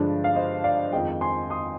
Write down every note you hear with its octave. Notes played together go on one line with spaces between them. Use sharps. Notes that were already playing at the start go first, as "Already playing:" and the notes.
Already playing: G2 D3 F3 G#3 D4
F5
C5 D#5
D5 F5
F2 D#3 G#3 D#5 G5
G#5 C6
C6 D#6